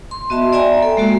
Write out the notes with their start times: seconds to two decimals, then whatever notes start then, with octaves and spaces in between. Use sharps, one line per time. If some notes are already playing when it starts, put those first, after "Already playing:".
0.11 C6
0.30 B3 F#4 D#5 E5 A5 C6
0.53 D5 E5 G5 G#5 A#5
0.83 A4
0.97 G#3 A#3 F#4